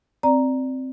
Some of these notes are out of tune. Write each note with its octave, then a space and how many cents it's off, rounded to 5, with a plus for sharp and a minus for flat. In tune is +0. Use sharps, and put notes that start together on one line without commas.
C4 +0 D5 +0 A#5 +0